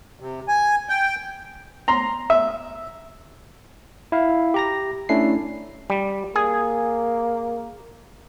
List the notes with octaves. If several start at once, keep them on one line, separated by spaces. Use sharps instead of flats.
C3
G#5
G5
A#5 C6
E5
E4 F5
G4 A#5 A#6
A3 C#4 D4 E4 C7
G3
A#3 G#4